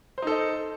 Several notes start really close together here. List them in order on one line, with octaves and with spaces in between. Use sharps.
C5 D#4 A4 D#5